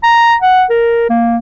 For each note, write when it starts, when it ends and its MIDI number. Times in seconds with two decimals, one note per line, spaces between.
0.03 0.35 82
0.42 0.63 78
0.70 1.05 70
1.10 1.37 58